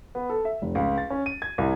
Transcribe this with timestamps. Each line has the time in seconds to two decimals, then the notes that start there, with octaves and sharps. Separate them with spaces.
0.15 B3
0.30 A4
0.45 E5
0.62 F1
0.75 C#2
0.98 A6
1.10 C#4
1.26 D#7
1.42 G#6
1.58 C2